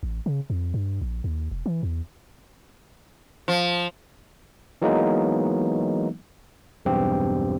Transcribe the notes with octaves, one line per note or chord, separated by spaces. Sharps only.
A1
C#3
F2
G2
A#1
D#2
E1
E3
E2
F3
E3 F#3 G#3 A#3 B3 D#4
B1 E2 G2 C4 G4